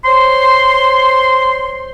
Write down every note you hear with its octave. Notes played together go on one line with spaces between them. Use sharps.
C5 C#5 C6